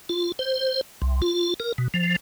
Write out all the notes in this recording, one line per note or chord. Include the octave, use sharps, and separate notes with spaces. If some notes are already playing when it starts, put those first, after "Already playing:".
F4
C5
C2
F4
A#4
B2
F3